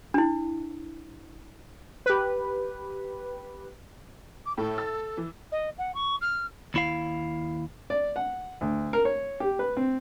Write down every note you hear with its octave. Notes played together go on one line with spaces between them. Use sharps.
D4 E4
G4 B4
D6
A2 A4
E6 A6
E3
D#5
F#5
C#6
F6
D#2 E4 F5
D5
F#5
D2
A#4
C#5
G4
B4
C4